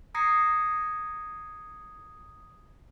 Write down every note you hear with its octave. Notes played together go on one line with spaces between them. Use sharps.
A#5 D#6 G#6 A#6 C7 C#7